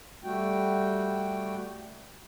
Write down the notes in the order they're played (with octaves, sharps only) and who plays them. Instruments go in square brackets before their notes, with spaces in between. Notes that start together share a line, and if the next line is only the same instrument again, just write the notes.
[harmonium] G3 A3 F#4 G5